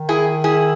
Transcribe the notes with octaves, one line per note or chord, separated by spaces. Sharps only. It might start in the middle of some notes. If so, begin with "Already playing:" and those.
Already playing: D#3
E4 G#4
E4 G#4